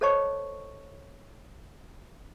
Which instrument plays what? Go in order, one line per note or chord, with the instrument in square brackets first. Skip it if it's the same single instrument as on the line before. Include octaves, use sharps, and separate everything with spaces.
[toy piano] A4 C5 C#5 D#5 A5 C#6